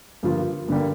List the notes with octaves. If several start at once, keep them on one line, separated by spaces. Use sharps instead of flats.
G2 D3 F3 A#3 F4
G2 D3 G3 A#3